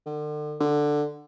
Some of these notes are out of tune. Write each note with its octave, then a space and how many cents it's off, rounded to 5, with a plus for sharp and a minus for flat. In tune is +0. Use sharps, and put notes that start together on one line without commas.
D3 +35
D3 +10